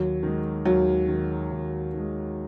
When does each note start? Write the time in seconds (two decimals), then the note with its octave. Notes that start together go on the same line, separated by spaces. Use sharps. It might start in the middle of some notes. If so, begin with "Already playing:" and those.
Already playing: D#2 F#3
0.23 D#3 G#3
0.65 D#2 F#3
1.08 D#3 G#3
1.51 D#2
1.94 D#3 G#3